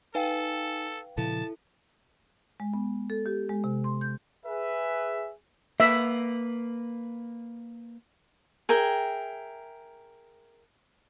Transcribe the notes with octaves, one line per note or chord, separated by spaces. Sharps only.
D#4 A4 B4 F5 G5 G#5
A#2 C#3 F3 E4 A4 A5
G#3
B3
A4
G4
G#3
C3
C6
G6
G#4 B4 E5
A#3 B4 E5
G#4 A#4 E5 G5